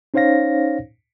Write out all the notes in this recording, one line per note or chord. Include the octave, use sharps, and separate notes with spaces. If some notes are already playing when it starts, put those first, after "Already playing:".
C#4 D#4 C5 C#5 F5 A#6